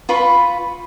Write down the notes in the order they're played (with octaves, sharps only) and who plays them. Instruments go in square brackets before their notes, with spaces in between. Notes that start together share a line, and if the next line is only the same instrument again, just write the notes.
[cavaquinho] F4 B4 B5 C#6